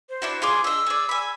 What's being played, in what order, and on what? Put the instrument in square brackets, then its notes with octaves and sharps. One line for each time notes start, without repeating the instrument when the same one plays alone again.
[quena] C5
[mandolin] D4 E4 F#4
[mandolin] F4 C6 D6 [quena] G#4
[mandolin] D4 D#5 [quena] E6
[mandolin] G#4 D5
G#5 B5